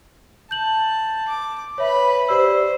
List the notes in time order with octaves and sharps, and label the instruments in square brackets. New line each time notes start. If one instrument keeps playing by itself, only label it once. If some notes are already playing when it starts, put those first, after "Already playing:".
[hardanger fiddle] A5 [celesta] G6 F#7
[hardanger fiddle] D6
[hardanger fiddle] B4 B5 [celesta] C#5 E5
[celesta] G4 D5 E6 [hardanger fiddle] C5